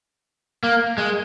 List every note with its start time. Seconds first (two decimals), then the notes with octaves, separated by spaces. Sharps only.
0.63 A#3
0.98 G#3